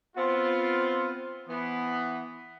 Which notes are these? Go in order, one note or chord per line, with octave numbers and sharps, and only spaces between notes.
B3 C4 F4
E3 B3